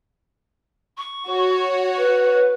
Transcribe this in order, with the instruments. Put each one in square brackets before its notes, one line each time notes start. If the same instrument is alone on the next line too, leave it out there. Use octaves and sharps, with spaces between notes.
[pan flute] C#6
[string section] F#4 C#5
[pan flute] B4